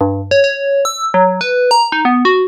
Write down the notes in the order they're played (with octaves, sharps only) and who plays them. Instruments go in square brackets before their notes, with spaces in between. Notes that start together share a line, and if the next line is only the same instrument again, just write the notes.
[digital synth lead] G2
C#5
C#5
E6
F#3
B4
A#5
D#4
B3
F#4